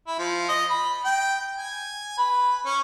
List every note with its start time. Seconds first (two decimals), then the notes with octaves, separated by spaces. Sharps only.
0.07 E4
0.19 F3
0.49 D#5
0.70 B5
1.05 G5
1.56 G#5
2.18 B4
2.66 C#4